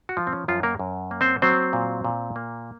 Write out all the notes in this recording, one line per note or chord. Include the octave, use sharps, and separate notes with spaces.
F#4
F3 F4
C4
C#4
F#2 F3 F4
A#3 A#4
F#2
A#3
C4 C5
F#3 C4 C5
A#2
A#2
A#3